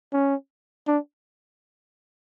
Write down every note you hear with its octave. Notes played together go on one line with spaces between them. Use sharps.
C#4
D4